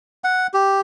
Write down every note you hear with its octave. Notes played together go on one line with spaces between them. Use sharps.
F#5
G4